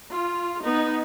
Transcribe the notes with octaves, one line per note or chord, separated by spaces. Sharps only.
F4
B3 D#4